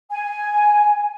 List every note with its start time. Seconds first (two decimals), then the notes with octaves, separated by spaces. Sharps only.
0.10 G#5